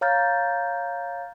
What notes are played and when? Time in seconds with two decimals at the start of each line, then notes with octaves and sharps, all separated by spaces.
0.01 C#5 F5 A#5 F6 G6 A6